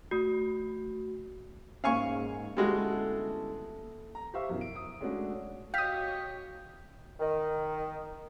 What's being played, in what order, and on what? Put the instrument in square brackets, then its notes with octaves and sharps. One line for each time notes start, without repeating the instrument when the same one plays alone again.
[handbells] A3 F#4
[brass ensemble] G#2 [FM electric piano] A#3 C#4 [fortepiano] F5 G#5 C#6
[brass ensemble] G1 E4 A4 [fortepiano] G3 G#3 F#4
[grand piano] A#5
G4 C5 E5 F5 C#6 E6
F#2 B2 E3
D7
D#6
G#3 A3 C#4 D4 F#4 G#4
[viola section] F#4 C#5 D#5 [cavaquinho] G4 [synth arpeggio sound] F5 D#6 [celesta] G6 B6
[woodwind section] D#3